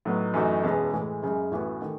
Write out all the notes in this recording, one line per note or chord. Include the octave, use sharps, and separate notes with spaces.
A2 F#3 B3 D#4
F#2 E3 A3 D#4 F#4
E1 E2 C#3 G#3 B3
A2 E3 G#3
F#2 C#3 G#3
A1 A2 E3 B3 F#4
D#3 A3